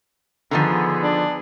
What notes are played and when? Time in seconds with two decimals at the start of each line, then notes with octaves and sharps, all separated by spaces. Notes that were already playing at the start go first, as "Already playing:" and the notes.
0.51 D3 D#3 F3 B3 G#4
1.03 D4